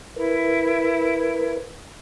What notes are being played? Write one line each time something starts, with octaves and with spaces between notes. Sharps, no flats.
E4 A#4 B4